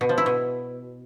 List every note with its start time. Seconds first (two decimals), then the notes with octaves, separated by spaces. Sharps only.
0.01 B2
0.09 F3
0.18 E4
0.26 B2